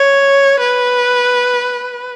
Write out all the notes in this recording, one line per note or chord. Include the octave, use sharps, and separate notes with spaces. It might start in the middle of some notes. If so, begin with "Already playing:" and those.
Already playing: C#5
B4